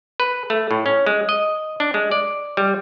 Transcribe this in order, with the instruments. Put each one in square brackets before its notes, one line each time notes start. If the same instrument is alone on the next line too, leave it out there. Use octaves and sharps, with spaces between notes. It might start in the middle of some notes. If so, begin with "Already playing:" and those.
[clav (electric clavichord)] B4
A3
A2
C#4
G#3
D#5
D4
G#3
D5
G3